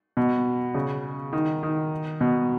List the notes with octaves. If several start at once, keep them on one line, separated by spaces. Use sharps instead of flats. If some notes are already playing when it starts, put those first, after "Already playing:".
B2
C#3
D#3
D#3
B2